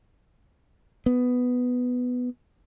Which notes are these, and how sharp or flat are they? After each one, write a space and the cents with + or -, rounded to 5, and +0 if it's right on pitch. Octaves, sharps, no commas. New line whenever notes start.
B3 +5